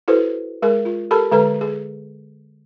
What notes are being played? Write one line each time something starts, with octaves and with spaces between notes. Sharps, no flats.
E4 F#4 A4 B4 C5
G#3 G#4 A#4
F4
G4 A4 A#4 A5 B5
D3 G#3 A4 B4 A#5
G#4